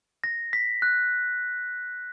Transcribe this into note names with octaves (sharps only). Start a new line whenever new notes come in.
A#6
B6
F#6